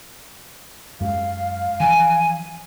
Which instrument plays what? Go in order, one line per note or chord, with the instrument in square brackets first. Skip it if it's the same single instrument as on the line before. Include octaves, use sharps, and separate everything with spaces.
[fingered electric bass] F#2 G#3 [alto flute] F5
[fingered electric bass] E3 F3 [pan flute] G#5